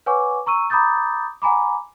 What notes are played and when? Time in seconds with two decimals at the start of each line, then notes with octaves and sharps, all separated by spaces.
0.06 B4 C#5 F#5 G#5 C#6 D6
0.46 A#5 C#6 E6 D#7
0.70 A#5 B5 D6 D#6 G6 A6
1.42 F#5 G#5 A#5 B5 D6